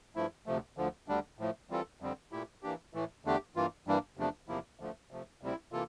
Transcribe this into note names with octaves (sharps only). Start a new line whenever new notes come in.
G2 F3 A3 E4
D2 C3 F3 A3
D2 D3 F3
D2 D3 G3 D4
A2 F3 A3
E3 G3 C4 F4 A4
F2 D3 G3 C4
A#2 A3 E4 G4
E3 A#3 D4 G4
A2 E3 A3
E2 D3 A3 D4 G4
G2 E3 A#3 F4
G2 E3 G3 A#3 D4
E2 C3 F3 A3 D4
E2 C3 F3 A#3 E4
D2 D3 F3 A3
C3 F3 A3
D2 C3 G3 C4 E4
C3 E3 A#3 F4 A4